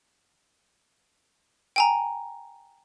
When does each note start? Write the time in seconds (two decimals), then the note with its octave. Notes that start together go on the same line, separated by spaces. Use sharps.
1.76 G5 G#5 A#5